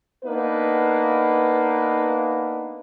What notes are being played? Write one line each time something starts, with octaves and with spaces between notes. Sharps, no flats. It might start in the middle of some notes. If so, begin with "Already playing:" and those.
A#3 B3 D4 D#4 B4